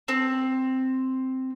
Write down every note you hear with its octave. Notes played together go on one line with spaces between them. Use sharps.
C4